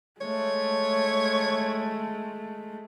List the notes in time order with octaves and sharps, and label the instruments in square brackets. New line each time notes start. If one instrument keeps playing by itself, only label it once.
[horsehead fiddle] G#3 A3 [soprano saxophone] C#5